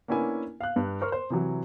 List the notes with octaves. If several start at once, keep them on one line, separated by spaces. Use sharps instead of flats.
A#3 B3 C#4 D4 E4 G#5
F5 F#6
G2
A#4 C5 C#6 F6
C5
C3 E3 F#3